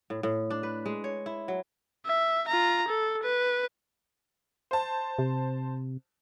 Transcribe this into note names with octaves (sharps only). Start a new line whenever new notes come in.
A2
A2
D4
B4
G#3
C#5
E4
F#3
E5
F4 A#5
A4
B4
C5 A5
C3